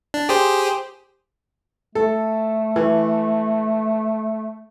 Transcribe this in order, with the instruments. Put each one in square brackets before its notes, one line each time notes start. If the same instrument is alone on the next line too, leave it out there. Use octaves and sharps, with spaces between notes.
[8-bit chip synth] D4
G4 G#4 C5
[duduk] A3 [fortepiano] A4
[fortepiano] E3